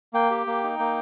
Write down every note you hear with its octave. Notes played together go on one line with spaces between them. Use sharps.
A#3 G5
G4
A#3
D#4
A#3